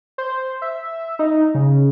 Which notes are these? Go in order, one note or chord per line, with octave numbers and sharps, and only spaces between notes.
C5
E5
D#4
C#3